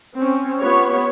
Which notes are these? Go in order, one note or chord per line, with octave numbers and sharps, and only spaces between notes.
C4 C#4
B3 F4 G4 C#5